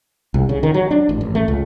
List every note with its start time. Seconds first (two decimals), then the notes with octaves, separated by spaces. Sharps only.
0.34 C2
0.49 C#3
0.63 D#3
0.74 F#3
0.91 D4
1.09 A1
1.21 A1
1.35 A3
1.48 C#2